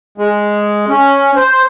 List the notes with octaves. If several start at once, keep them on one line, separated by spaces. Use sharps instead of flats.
G#3
C#4
C5